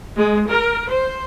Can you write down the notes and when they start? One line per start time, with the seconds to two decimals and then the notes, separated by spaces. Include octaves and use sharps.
0.18 G#3
0.49 A#4
0.89 C5